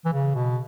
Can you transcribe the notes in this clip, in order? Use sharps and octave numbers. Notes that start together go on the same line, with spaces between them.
E3
C#3
B2